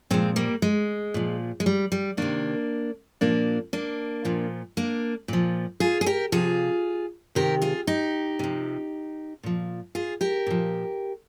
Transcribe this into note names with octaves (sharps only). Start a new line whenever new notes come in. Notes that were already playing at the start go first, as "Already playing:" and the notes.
A#2 F3 G#3 C4
G3 A#3
G#3
A#2 F3
G#3
G3
G3
C3 D#3 A#3 D4
A#2 F3 A#3 D4
A#3 D4
A#2 F3
A#3 D4
A#2 F3
F4 G#4
G#4
G4 A#4
C3 F3 F4 G#4
C3 D#3 G4 A#4
F4 G#4
D#4 G4
C3 F3
A#2 F3
F4 G#4
G4 A#4
A#2 F3